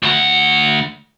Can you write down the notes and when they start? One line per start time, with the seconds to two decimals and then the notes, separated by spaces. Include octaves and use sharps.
0.03 D2 F#5